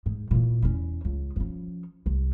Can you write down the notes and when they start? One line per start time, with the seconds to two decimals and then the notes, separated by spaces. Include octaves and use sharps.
0.06 G#2
0.31 A#2 E3
0.62 E2 C#4
1.05 C#2
1.36 F3 C#4
2.06 C2